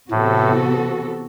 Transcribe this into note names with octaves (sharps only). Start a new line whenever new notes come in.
A2 C3 E3 B3 F#4 A4